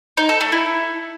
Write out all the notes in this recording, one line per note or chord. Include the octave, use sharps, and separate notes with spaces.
D#4
A4
A3
E4